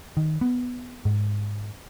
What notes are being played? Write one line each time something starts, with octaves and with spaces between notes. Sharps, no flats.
D#3
B3
G#2